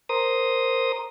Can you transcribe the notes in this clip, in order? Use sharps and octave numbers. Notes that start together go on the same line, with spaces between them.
A#4 C5 D#6